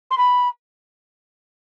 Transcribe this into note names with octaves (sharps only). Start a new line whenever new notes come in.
C6
B5